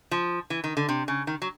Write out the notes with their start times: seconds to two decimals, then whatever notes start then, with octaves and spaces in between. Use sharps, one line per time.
0.11 F3
0.50 E3
0.64 D#3
0.77 D3
0.89 C3
1.08 C#3
1.27 D#3
1.42 F#3